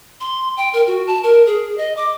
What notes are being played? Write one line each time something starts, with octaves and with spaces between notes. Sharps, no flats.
C6
G5
A#4
F#4
A5
A#4
G#4
D#5
D6